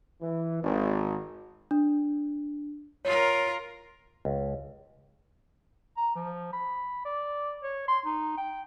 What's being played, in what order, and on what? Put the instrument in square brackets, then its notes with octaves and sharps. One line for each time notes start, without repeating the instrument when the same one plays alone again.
[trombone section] E3
G#1
[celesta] D4
[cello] F4 A#4 [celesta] C#5
[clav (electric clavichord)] C#2
[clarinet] A#5
F3
B5
D5
C#5
C6
D#4
G5